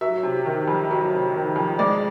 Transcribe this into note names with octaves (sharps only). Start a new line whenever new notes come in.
F#3 E5
C3
D#3
F2
F#3
C3
D#3
F2
G#3 D5